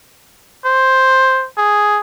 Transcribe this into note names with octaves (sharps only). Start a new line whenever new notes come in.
C5
G#4